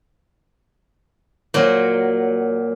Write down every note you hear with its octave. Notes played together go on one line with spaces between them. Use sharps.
A#2 F#3